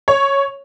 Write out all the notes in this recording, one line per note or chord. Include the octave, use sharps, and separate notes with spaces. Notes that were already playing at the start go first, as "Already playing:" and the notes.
C#5